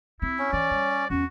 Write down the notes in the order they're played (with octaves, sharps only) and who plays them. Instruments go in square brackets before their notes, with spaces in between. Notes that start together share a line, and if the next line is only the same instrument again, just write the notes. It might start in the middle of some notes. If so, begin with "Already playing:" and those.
[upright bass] C4 [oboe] E4
[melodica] C#4
[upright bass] E3 [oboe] D5
[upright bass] G3
[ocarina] C#5
[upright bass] E2 [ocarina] C#4 [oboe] F#4